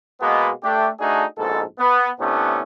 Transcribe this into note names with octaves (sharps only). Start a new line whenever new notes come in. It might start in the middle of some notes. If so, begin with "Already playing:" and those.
B2 G#3 A#3 B3
A3 D4 G4
A3 D4 D#4 F#4 G#4 A4
A#1 G#2 B2 A4
B3
A2 C3 A3 B3 C#4 D4